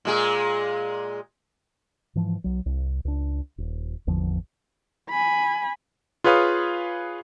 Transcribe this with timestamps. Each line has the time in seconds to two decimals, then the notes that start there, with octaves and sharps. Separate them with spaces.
0.05 A#2 G#3 G#4
2.15 G#2 E3 F3
2.44 B1 F#3
2.66 C2
3.05 C#2 D4
3.58 D#1
4.07 G#1 E2 D3 F3
5.10 G#5 B5
6.24 F4 G#4 B4 C#5 F5 D#6